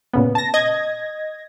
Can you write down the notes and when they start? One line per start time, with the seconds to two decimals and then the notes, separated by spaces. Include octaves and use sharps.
0.13 A#2 C#3 B3
0.35 A5 A#6
0.54 D#5 G#6 A#6